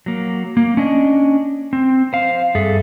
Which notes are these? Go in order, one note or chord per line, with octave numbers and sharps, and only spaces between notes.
F#3 A#3
A#3
C#4 D4 D#5
C4
C5 F5
G2 G#4 A4 E5